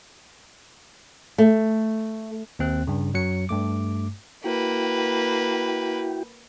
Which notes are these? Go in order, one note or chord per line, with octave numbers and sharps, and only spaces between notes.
A3
D#2 C4 F#6
G2 C#3
F#2 F#3 C#7
G2 A3 D6
A#3 E4 F#4 B4 G5